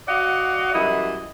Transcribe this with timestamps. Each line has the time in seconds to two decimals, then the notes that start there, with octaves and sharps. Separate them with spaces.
0.08 F#4 D5 D#5 F5 F#5
0.74 F#2 E3 G3 E4 D#5